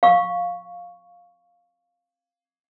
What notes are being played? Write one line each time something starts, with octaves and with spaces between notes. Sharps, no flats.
F5 C#6